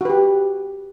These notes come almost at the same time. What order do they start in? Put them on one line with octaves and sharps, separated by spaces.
F#4 B4 G4